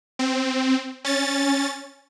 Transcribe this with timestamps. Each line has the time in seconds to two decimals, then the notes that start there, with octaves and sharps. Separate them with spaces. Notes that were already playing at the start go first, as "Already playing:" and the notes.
0.19 C4
1.05 C#4 A6